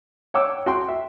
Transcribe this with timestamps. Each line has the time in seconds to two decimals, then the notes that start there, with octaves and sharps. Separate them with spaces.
0.34 C#5 F#5 G5 D6 E6
0.66 F#4 G5 C6
0.88 E5